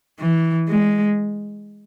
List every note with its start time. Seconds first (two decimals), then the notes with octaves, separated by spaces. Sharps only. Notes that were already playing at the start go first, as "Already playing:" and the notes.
0.20 E3
0.68 G#3